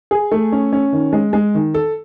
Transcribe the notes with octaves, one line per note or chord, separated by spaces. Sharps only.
G#4
A3
C#4
C#4
D#3
G#3
G#3
D#3
A4